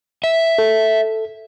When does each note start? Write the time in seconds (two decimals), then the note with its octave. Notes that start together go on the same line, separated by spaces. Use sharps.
0.24 E5
0.58 A4